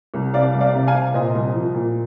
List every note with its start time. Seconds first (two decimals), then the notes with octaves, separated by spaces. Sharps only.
0.14 C2
0.34 C3 D5 F5
0.54 C2
0.60 D5 F5
0.74 C3
0.87 F5 G#5
0.94 C3
1.14 A#2 C5 D#5
1.34 C2
1.54 F3
1.75 A#2